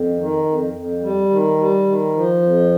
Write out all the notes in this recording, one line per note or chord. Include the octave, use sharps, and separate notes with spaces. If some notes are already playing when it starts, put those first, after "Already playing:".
Already playing: F2
D#3
F2
F2
G3
D#3
G3
D#3
F3
F2